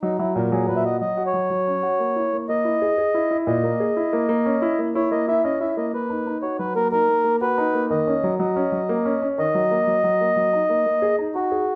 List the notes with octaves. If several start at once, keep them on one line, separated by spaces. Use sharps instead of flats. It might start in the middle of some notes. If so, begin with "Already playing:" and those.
F#3 D#4
F#3 E4
A#2 A#4
F#3 G#4
A#2 B4
E5
F#4 D#5
F#3 D#5
F#4
C#5
F#3
F#3
C#4
F#4
A#3
E4
A#3
A#3 D#5
E4
G#4
G#4
E4
E4
A#2 D#5
A#3
G#4
E4
A#3
A#3
C#4
E4
A#3
E4 C#5
A#3 D#5
E4 E5
C#4 D#5
E4 E5
A#3 D#5
A#3 B4
D#4
D#4
F#4 C#5
F#3 B4
A#3 A#4
D#4 A#4
A#3
A#3
F#4 B4
D#4
A#3
D#3 D#5
C#4
F#3
F#3 D#5
C#4
F#3
A#3
C#4
C#4
D#3 D#5
F#3
A#3
F#3
F#3
A#3
F#3
D#4
A#3
A#3
G#4
D#4
D#4 F#4
G#4